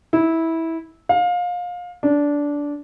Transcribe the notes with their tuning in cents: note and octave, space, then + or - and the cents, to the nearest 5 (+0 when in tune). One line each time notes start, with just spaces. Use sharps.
E4 -15
F5 +25
D4 -15